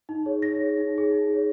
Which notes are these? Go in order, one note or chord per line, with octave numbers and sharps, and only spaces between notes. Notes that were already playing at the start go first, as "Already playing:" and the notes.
D#4
G#4 C#5
D#4 A#6
G#4 C#5
D#4
G#4 C#5
D#4
G#4
C#5